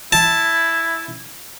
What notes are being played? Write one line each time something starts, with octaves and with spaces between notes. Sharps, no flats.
E4 A5